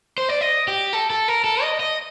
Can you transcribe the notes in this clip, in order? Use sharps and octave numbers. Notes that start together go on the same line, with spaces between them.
C5
D5
D#5
G4
A4
A4
A#4
A4
D#5
D#5